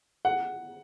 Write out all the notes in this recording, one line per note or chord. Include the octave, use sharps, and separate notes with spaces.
F#5